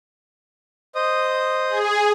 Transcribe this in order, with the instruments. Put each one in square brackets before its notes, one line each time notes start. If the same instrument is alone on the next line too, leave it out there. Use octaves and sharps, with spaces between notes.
[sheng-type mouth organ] C5 D#5 D#6
[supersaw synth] G#4